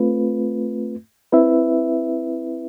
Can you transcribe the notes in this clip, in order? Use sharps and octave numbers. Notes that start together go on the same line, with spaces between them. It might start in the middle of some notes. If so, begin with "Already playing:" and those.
Already playing: A3 C4 F4 B4
C4 E4 B4 E5